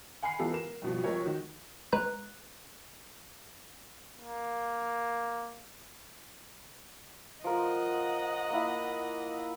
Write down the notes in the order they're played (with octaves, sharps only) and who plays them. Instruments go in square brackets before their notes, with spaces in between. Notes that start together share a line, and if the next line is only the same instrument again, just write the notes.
[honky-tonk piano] F#5 G#5 B5 F6 C7
E3 G#3 B3 F4 G4 A4
A#4 E7
G2 B2 F3
C3 F3 G#3 A#4 C#5
D#3 F#4
[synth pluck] G#3 B4 A#5 F#6
[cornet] A#3
[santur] F3 A#4 [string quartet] D#5 F#5
[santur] A#3 E4